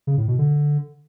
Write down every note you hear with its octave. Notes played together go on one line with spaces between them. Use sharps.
C#3
A2
B2
D3